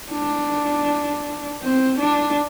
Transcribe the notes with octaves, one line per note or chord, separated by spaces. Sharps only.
D4
C4
D4